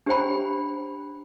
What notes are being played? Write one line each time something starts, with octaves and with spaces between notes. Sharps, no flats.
D4 G4 C5 G5 B5